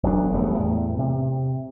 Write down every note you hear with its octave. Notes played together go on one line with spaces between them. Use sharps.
E1 B1 F#3 D4
E1 G3 A3 B3
E2 A2
C3